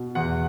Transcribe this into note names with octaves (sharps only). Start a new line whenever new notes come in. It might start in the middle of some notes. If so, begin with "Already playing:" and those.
Already playing: B2
E2 F#5